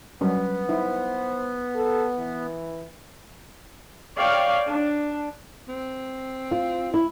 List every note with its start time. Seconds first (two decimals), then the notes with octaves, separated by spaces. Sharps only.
0.21 F#3 G3 B3 C#4
0.69 D#4 E4 C5
1.75 A4
2.18 E3
4.18 C#5 D5 F5 G5
4.70 D4
5.68 C4
6.51 F4
6.94 E4